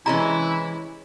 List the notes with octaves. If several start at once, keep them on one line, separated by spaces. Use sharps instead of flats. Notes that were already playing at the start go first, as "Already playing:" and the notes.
C3 E3 G#3 C#4 E4 A#5